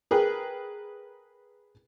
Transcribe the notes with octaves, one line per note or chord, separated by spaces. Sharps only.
G#4 A#4 B4 G5